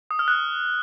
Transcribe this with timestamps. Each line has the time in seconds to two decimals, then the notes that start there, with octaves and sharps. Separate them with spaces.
0.11 D#6
0.19 F6
0.28 F#6